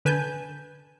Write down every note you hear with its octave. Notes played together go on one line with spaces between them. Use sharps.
D3 B4 G#5 A5 G6